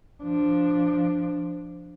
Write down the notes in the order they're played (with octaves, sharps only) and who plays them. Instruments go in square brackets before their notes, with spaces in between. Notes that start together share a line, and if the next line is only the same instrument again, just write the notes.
[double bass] F3 D4